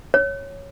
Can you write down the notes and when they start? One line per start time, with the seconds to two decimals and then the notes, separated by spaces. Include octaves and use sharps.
0.14 C#5